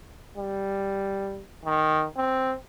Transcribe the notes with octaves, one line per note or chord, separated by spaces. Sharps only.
G3
D#3
C4